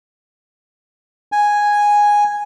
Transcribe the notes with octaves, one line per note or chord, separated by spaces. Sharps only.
G#5